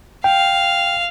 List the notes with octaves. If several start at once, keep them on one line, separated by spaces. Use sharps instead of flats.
F5 G5